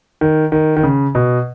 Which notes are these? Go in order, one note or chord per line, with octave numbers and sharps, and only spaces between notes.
D#3
D#3
D#3
C#3
B2